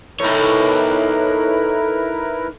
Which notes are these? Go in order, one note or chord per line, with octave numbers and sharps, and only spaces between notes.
A2 D#4 E4 A#4 B4 C#5